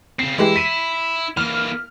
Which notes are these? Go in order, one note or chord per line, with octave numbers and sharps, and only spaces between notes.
C#3 C4 C7
E3 G#3 E4 G4
B6 D#7
E3 A#3 F6